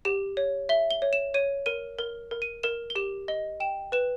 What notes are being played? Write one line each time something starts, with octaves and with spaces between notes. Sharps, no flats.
G4 E7
C#5
E5 G7
G7
C#5
E7
C#5 D#7
A#4 D#7
A#4 G7
A#4
D#7
A#4 E7
G7
G4 E7
D#5 G7
G5 E7
B4 E7